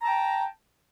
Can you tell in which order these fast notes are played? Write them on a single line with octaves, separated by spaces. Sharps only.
A#5 A5 G5